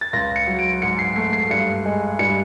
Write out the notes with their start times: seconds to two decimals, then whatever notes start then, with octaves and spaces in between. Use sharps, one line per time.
0.01 A6
0.13 C#2 A#6
0.36 C#7
0.47 F#3
0.59 D7
0.82 G#2 C#7
0.99 C7
1.16 A3 C7
1.33 C7
1.50 G2 C#7
1.85 G#3
2.19 G2 C#7